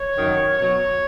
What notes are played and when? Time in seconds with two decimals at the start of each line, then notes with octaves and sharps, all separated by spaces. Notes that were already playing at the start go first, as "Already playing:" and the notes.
Already playing: C#5
0.17 F#2 D#3 F#3
0.58 B2 F#3 C#5